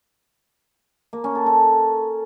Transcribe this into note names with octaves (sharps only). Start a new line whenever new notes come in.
A#3
C#4
A4
A4